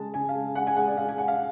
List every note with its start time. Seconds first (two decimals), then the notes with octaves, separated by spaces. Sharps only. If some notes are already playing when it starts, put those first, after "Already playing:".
Already playing: C#3 G#3 A5
0.14 C#3 G#5
0.29 F5
0.35 G#3
0.55 G#3 F#5
0.67 G#5
0.76 G#3 F#5
0.88 D5
0.97 G#3 F5
1.08 G#5
1.18 G#3 F#5
1.28 F5